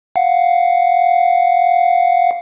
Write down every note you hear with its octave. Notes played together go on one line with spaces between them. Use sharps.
F5 F#5